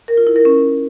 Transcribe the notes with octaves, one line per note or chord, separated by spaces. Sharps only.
A#4
F4
E4
A#4
C#4